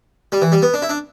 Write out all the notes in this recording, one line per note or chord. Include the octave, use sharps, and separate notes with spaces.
G3
E3
G3
B3
D4
E4
D4